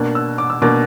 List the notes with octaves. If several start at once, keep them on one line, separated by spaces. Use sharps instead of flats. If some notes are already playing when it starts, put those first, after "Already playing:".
Already playing: B2 A#3 D4 F#6
E6
D6
E6
B2 A#3 D4 D6